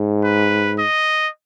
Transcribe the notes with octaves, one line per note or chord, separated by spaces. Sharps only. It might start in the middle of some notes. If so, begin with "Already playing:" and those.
Already playing: G#2
B4
D#5